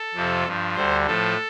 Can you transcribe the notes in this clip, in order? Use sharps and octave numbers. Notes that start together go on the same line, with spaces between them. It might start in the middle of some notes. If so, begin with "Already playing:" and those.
Already playing: A4
F2 C3 F3
G2 F3
D2 D3 G3 C5
A2 F3 A4